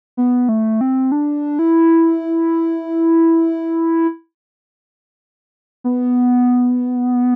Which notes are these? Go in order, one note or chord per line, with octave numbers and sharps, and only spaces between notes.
B3
A3
C4
D4
E4
B3